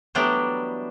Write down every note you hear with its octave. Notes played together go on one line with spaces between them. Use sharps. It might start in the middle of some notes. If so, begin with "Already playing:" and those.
E3 F#3 G3 A3 B3 D4